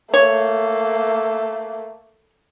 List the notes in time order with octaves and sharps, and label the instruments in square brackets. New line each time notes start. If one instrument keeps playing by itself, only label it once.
[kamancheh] A3 A#3 [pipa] C#5